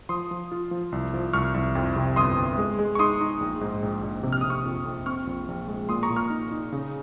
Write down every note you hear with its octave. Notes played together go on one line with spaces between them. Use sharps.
F3 C6 D#6
F3
F4
F3
C2
F3
C2 C#6 F6
C2
F2
C3
G1 C6 D#6
G1
G#3
G#3
C#6
D#4 C6 D#6
D#4
A#1
G#2
A#1
A#1
C3
F6
C3 D#6
C#6 F6
F2
F2
C4 C#6 F6
A#1
A#1
G#3
A#2 C6 D#6
A#5 C#6
A#2
C#6 F6
D#4
D#4
C#3